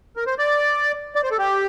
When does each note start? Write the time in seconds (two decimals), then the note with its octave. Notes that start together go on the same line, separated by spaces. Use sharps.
0.16 A#4
0.27 C5
0.38 D5
1.15 D5
1.23 C5
1.31 A4
1.39 G4